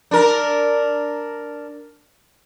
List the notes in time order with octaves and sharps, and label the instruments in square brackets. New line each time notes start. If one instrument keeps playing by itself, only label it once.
[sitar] D4 A#4